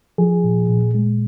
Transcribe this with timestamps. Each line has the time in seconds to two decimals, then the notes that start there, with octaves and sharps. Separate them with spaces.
0.18 F3 G#4
0.44 A#2
0.69 A#2
0.95 G#3